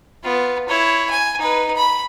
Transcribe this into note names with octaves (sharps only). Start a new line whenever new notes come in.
B3 F4
E4 C#5
G#5
D#4 B4
B5